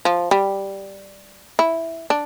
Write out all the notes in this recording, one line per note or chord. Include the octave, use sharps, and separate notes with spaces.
F3
G3
E4
D4